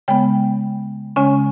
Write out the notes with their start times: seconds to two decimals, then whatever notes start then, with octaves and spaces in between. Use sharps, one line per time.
0.08 C#3 G#3 B3 G5
1.16 C#3 G#3 C#4 G#5